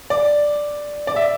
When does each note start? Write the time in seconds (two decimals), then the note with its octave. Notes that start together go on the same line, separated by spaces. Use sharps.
0.10 D5
1.07 D5
1.16 E5